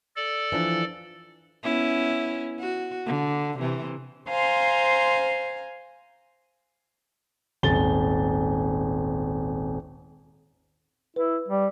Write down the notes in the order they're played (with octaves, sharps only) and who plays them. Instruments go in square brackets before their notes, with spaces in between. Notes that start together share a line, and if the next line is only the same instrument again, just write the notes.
[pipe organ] A4 D5
[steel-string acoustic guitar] E3 F3 D4
[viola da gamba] B3 C#4 E4
F#4
D3
C3 E3
[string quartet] C5 F5 G#5 A#5 C6
[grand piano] D#1 G#1 A6 G7
[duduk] E4 [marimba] B4
[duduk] G3